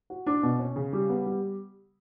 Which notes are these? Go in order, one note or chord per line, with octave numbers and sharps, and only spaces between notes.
F#4
D4
B2
C#4
C#3
G3
B3
G3